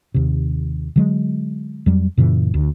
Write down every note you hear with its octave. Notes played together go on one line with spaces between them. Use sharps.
D#2 C3
D3 F#3 G#3
F2 F#3 G3
F#2 A#2 C#3 E3
D2